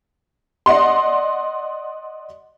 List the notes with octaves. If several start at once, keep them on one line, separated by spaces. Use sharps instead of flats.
D5 D#5 F#5 C6